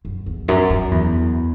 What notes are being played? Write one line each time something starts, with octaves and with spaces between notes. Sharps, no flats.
F#2
E2
F#2
F#2
E2